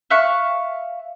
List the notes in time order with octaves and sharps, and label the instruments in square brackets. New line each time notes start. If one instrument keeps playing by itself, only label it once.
[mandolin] E5 F5 C#6 F#6